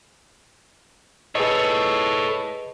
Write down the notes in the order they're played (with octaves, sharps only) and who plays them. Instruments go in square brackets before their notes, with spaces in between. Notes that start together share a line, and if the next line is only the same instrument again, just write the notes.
[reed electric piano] G#4 B4 D#5 [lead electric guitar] A4 C#5